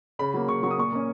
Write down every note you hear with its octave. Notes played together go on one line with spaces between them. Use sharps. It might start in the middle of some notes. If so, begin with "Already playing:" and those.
C#3 B5
F#3 A#3
C#3 C#6
F#3 A#3 C#6 D#6
A#2 C#6
A#3 C#4